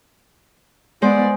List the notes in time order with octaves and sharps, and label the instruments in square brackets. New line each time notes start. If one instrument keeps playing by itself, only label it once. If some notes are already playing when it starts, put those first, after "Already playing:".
[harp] G#3 C5 [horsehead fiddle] B3 D5